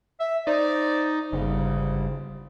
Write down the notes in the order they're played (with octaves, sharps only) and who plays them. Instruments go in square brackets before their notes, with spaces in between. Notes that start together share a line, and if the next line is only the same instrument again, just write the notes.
[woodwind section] E5
[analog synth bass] D#4 [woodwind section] C5 D5
[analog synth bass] G1 [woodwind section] G#2 C#3